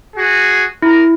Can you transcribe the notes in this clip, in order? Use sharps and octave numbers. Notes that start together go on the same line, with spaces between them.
F#4 G#4
E4 A#4